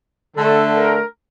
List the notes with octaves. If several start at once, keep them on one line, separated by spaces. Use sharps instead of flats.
D3 A3 A4
A#4